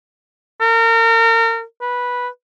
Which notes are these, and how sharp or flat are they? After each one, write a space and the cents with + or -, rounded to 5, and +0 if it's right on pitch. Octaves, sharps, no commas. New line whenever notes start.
A#4 -35
B4 -10